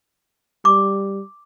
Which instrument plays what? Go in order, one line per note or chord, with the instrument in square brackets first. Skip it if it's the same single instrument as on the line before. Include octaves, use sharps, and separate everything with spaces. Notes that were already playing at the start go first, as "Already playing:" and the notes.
[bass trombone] G3 [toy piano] D6